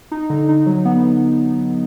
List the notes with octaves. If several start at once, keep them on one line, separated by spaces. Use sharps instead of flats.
D#4
D3
D#4
F#3
B3